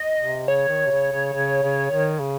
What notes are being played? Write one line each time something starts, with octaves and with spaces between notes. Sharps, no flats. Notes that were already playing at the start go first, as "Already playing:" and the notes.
Already playing: D#5
C3
C#3 C#5
D#3
C3
C#3
C#3
C#3
C#3
D#3
C#3